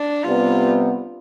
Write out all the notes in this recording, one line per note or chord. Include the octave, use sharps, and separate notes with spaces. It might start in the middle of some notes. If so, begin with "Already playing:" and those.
Already playing: D4
C3 G3 B3 F4